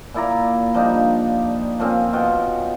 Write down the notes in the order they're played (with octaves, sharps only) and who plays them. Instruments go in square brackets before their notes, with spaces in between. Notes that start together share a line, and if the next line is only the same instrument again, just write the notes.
[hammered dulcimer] A#2 E4 D5 A#5
F3 G3 D4 D#4
F3 A#3 C4 C#4
B2 F4 F#4 G5